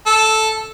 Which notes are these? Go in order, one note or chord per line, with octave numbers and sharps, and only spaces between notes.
A4